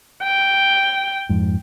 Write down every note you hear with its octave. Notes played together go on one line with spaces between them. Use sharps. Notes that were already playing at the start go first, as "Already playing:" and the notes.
G5
F2 G#2